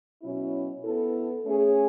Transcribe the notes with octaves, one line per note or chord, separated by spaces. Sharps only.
B2 F#3 C#4 E4
B3 E4 A4
A3 C#4 G#4 C#5